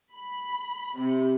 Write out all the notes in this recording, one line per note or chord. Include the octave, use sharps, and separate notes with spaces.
B5
C3